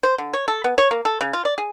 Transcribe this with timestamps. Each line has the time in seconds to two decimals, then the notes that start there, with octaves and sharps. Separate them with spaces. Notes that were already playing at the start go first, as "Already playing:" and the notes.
0.03 C5
0.18 D3
0.33 C#5
0.48 A4
0.64 B3
0.78 C#5
0.91 A#3
1.05 A4
1.21 C#3
1.33 F4
1.45 D5
1.58 G#4